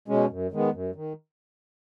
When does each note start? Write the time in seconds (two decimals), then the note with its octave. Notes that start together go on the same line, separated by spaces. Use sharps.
0.08 B2 G#3 C#4
0.30 F#2
0.52 D#3 G#3 B3
0.73 F#2
0.95 D#3